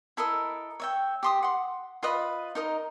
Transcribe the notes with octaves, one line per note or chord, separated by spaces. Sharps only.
E4 A4 A#4 D#5
C#5 E5 G5
G4 C6 D#6
F#5 C6
F4 B4 D#5 B5
D#4 A#4 D#5